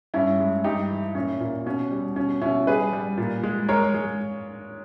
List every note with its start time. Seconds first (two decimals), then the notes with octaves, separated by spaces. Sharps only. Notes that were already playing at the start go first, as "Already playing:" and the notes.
0.14 G2 C#4 E4
0.40 G#3
0.64 G2 D#4 G4
0.91 E3
1.15 A#2 C#4 E4
1.40 A#2
1.66 B2 C#4
1.91 G3
2.16 B2 C#4
2.42 B2 C#4 E4
2.67 G3 G#4 B4
2.93 G3
3.17 A#2
3.43 G#3
3.69 G#3 A#4 C#5
3.94 G#3